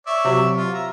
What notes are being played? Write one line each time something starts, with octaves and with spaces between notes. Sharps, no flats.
C#5 D5 E5
C3 F#3
F4
E5 A#5